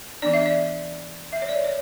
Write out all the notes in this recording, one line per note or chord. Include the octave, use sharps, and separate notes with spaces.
E3 B3 D4 D5
E5
D5
E5
C#5
D5
C#5